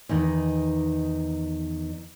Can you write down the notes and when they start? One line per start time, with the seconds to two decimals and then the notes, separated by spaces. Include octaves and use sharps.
0.09 E2 D#3 D#4